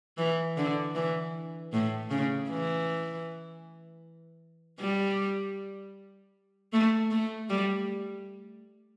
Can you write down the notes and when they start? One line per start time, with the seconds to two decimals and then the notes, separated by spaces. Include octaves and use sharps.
0.18 E3
0.57 D3
0.95 E3
1.73 A2
2.10 C#3
2.49 E3
4.80 G3
6.73 A3
7.11 A3
7.49 G3